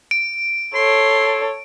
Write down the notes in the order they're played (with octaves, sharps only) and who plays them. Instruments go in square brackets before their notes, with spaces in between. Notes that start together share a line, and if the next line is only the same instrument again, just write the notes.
[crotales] D7
[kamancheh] A4 C#5 [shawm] C6